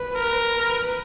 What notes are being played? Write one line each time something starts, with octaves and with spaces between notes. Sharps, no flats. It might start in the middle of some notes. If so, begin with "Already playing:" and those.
Already playing: B4
A#4
B4